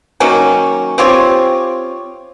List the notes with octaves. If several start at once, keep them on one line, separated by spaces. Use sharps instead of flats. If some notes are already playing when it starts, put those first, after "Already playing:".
D#3 F#3 A#3 C#4
C4 F4 G4 C#5